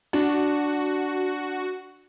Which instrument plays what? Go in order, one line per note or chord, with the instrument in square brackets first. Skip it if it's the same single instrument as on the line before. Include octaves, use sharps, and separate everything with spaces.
[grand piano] D4 [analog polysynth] F#4